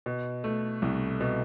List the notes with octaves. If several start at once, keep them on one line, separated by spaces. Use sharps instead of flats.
B2
A3
C2
B2